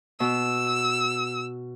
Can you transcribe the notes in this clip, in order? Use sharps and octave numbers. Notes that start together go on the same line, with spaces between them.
B2 E6